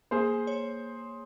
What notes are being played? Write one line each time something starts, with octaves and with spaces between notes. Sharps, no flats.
A#3 G#4 C5
C#5